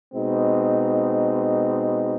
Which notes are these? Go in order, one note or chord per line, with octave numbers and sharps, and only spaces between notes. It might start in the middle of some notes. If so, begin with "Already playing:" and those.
B2 G#3 C4 D#4